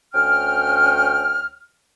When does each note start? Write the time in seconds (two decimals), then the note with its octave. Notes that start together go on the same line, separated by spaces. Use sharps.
0.14 D2 C#4 G5 F6